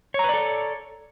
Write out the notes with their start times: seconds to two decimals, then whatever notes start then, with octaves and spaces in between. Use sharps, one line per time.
0.14 C#5
0.19 A#5
0.24 B4
0.29 D5
0.34 A4